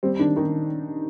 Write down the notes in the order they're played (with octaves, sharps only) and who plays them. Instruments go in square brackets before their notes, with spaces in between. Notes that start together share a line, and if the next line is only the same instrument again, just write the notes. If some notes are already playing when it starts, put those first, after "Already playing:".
[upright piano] G3 C4
D#3 D4
D#3 D#4